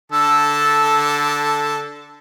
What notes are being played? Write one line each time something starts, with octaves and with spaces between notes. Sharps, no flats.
D3 A4 A5 E6